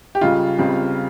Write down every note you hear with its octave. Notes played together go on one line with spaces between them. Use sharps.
G4
C#2 C#3 G3 F4
C#2 C#3 G3 C4